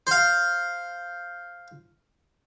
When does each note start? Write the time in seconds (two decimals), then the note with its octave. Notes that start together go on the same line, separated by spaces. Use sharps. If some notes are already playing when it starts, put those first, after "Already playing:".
0.07 C5 F5